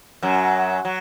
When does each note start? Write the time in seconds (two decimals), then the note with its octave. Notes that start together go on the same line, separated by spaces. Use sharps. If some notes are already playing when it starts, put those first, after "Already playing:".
0.22 F#2 F#3
0.85 F#3